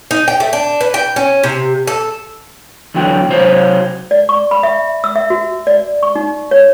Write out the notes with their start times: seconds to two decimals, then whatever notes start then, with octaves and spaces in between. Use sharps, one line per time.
0.11 D#4
0.28 G5
0.40 A3
0.53 D4
0.81 B4
0.94 G5
1.16 C#4
1.43 C3
1.87 A4
2.94 E2 D3 F#3 G5
3.29 C3 F#3 C5 C#5
4.11 D5
4.29 C#6
4.51 B5
4.63 E5
5.04 E6
5.16 E5
5.30 F#4
5.67 D5
6.03 C#6
6.16 D#4
6.51 C#5